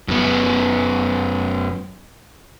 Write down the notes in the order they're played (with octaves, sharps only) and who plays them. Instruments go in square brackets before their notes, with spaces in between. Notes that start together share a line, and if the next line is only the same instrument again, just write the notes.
[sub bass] F1 [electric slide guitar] F#2 B3